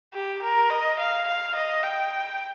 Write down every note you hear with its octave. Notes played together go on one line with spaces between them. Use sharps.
G4
A#4
D#5
F5
F5
D#5
G5